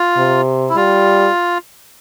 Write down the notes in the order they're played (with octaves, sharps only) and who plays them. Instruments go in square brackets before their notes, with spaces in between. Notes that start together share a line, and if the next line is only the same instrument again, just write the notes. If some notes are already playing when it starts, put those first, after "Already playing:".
Already playing: [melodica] F4
[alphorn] C3
[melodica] E4
[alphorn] G3 [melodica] F4